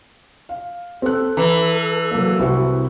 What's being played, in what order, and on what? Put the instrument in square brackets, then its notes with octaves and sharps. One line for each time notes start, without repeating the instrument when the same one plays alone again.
[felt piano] F5
[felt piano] C4 F#6 [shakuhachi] A4
[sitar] E3 [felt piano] A#5
[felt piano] F#3 A#3
[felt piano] C2 C4 F#4 [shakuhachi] E4